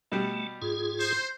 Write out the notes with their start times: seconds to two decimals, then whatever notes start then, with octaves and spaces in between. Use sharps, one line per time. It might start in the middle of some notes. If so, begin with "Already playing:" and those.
0.12 B2 G3 A3
0.62 G#2 F4 G#4
0.99 C5